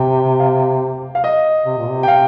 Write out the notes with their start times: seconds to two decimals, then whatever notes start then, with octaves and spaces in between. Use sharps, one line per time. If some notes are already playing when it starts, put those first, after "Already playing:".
Already playing: C3 G5
0.40 F5
1.15 F5
1.24 D#5
1.66 C3
1.78 A#2
1.89 C3
2.03 G5
2.08 C3 F5